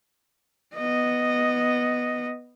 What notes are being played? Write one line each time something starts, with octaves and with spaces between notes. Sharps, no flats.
B3 D#5